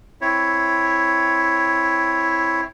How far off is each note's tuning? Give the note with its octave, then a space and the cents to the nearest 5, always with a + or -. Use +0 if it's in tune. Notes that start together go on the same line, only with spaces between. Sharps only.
C4 +0 E4 +0 C#5 +0